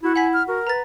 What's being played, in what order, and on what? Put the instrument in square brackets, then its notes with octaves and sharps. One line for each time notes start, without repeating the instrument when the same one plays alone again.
[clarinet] E4 [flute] F#4
[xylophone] F#5 B5 B6 [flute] G#5
[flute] F6
[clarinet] F#4 [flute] A#4
[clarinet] B4 [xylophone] A#5 A6